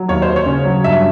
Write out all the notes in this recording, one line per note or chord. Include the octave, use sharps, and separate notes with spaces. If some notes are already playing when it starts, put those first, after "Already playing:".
Already playing: F#3
D#2 C#5
C5
D#2
C#5
C#3
F#3
G2 E5